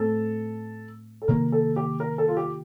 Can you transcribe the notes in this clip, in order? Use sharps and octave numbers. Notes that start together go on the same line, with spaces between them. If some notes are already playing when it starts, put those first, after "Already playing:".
Already playing: A2 A3 C4 A4
A4
C3 D#3 A#3 A#4
A4
G4
A#4
A4
F4
G4